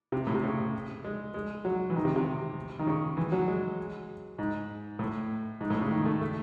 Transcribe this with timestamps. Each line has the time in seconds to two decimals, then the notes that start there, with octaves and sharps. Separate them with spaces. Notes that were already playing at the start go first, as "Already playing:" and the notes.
0.12 C3
0.27 A2
0.35 C3
0.43 C#3
1.04 G#3
1.34 G#3
1.65 F#3
1.90 E3
1.96 D#3
2.05 C3
2.16 C3
2.79 D#3
2.87 C#3
3.17 E3
3.32 F#3
3.48 G#3
4.38 G#2
4.99 A2
5.61 G#2
5.70 A2
5.81 C#3
5.91 D#3
6.05 A3
6.21 A3